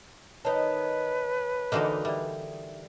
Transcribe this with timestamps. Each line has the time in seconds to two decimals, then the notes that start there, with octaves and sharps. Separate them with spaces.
0.45 D#3 D#4 B4 C#5 A5
1.72 D3 E3 A#3 D#4 F#4 A4
2.05 G3 D5 E5